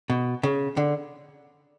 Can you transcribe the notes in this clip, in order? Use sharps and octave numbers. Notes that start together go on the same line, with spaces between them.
B2
C#3
D3